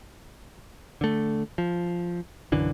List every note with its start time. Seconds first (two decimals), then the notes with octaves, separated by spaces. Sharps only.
1.01 D3 A3
1.58 F3
2.52 B1 F#2 D3 E3